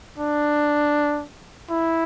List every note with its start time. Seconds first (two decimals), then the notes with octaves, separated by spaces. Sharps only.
0.18 D4
1.71 E4